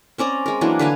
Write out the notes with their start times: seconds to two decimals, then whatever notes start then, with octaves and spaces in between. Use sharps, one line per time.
0.18 C4 C#4 D5 A#5
0.46 G#3 A#4
0.61 E3 F#3 A#3 D4
0.79 D3 B4 F5 G#5